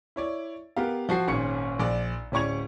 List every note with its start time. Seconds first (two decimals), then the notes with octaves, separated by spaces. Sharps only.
0.16 E4 C#5 D5
0.76 B3 G4 A#4 F5
1.09 F3 F#4 A5 C7
1.27 G#1 A#2 C#4 C#5 C#6 C#7
1.79 A#1 D5
2.32 D1 C#4 D5 C#6 G#6 F7